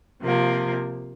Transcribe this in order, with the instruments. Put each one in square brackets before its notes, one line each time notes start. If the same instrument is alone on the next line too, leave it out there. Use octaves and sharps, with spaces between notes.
[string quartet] C3 F3 A#3